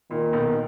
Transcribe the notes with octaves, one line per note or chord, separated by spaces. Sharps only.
A#2 D#3
B1 B2
A#2